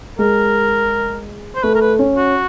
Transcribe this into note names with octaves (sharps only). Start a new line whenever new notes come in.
G#3 A#4
C5
A3 B4
A#4
B4
C#4
F#4